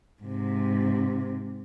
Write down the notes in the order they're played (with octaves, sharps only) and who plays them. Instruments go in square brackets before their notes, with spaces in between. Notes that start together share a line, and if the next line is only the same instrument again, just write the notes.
[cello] G#2 C3